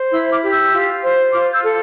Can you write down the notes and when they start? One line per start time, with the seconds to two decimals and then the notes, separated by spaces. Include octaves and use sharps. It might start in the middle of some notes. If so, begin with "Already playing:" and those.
Already playing: C5
0.11 E4 C6 E6
0.32 D6 F6
0.42 G4
0.52 E6 G6
0.72 F4
1.03 C5
1.33 F4 D6 F6
1.53 E6 G6
1.63 A4